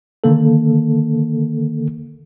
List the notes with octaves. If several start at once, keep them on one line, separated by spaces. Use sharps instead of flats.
D3 D#3 A#3 A4